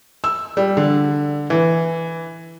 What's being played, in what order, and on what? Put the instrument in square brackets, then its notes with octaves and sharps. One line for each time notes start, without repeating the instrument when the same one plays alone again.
[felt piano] E6
G3
D3
E3